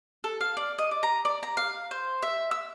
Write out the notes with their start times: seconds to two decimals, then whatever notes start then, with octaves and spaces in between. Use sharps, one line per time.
0.24 A4
0.41 F5
0.57 D5
0.78 D#5
0.91 D5
1.03 A#5
1.25 D5
1.43 A#5
1.57 F5
1.91 C5
2.22 E5
2.51 E6